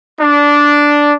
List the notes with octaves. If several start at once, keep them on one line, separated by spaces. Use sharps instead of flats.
D4